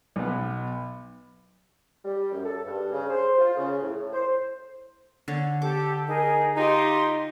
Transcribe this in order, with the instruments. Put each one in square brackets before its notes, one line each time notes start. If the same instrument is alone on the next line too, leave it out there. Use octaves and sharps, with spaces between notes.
[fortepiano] B1 B3
[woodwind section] G3
F#2
A4
G2
C#3
C5
F4
C#3
A2
C5
[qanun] D3 C#5
[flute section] G4 A4 A5 [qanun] D6
[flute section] D#4 G#4 A#4
[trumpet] D#4 [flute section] F4 G4 C6